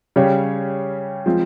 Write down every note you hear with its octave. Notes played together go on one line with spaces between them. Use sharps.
C#3 G3 C#4 G4 C#5
F3 G#3 C4